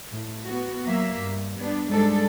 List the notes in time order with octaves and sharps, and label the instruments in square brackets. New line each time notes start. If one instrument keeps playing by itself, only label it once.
[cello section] A2
B3 F#4
F#3 A#3 E5
G2
G3 B3 D4
G#2 G3 G#3 D4 A4